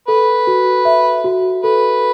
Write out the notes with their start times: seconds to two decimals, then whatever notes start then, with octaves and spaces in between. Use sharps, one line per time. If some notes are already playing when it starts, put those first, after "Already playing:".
0.08 A4 B4
0.47 F#4
0.85 E5
1.24 F#4
1.64 A4 B4